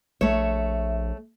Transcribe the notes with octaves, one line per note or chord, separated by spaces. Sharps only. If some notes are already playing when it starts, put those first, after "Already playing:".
A#1 A3 C#5 E5